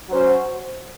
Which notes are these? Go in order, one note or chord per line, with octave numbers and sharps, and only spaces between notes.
F#3 C#4 F#4 C5